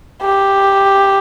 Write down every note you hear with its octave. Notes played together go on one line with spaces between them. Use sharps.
G4